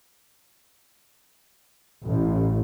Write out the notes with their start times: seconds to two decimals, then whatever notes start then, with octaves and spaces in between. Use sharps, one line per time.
2.04 A1